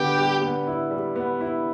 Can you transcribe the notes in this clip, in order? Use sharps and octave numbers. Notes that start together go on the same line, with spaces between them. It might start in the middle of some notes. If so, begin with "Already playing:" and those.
Already playing: D3 G3 B3 G4
G3
B3
E4
G3
B3
E4